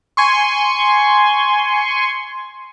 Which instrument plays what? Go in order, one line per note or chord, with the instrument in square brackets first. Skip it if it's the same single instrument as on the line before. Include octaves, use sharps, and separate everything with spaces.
[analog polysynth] G#5 C6 C#6